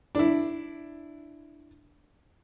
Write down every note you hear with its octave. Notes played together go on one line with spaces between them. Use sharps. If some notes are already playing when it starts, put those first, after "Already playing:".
D4 E4